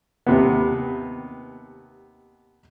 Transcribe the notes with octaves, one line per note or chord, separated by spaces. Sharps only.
D#2 C3 B3